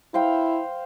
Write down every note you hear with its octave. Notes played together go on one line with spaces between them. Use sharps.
E4 C5 F5 G5